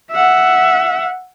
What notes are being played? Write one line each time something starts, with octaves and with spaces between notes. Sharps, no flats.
E5 F#5